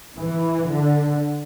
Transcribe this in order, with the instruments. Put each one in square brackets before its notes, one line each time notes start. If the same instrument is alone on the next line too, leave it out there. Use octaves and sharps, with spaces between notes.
[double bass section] E3
D3